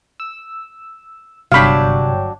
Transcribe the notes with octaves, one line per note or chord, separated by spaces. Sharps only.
E6
G1 C3 F#3 D4 C#5 F5 G5 B5